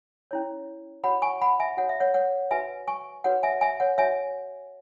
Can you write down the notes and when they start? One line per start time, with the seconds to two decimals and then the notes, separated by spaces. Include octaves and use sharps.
0.31 C#4 E4 C#5
1.04 F#4 C#5 F#5 B5
1.22 G#5 C#6
1.41 F#5 B5
1.60 E5 G#5
1.77 F#4 C#5 F#5
1.89 E5
2.00 C#5 F#5
2.14 C#5 F#5
2.51 F#4 B4 E5 G#5
2.88 G#5 C#6
3.24 F#4 B4 C#5 F#5
3.43 E5 G#5
3.61 E5 G#5
3.80 C#5 F#5
3.98 F#4 C#5 E5 G#5